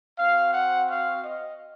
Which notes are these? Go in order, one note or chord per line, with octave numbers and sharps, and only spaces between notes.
C4 F#4 F5
F#5
F5
D#5